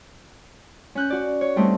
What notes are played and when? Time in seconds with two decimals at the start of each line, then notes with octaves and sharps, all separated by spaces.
0.95 C#4 F#6 G6
1.10 F#4 D5
1.41 C#5
1.56 G3 A3 C4 D#4